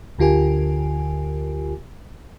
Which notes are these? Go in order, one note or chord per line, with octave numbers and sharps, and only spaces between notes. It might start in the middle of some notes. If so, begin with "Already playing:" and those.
D2 D3 F4 G4 A#4 G#5